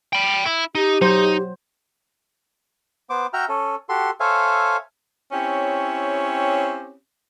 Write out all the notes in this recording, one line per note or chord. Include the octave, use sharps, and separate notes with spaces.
G5 B5
E4
D#4 G4
F#3 D#4 C5
B3 C5 D6
F#4 E5 G5 A#5 F6
C#4 A4
F#4 G4 A4 C6
A4 C5 C#5 E5 F5 G#5
C4 C#4 E4 G4 C#5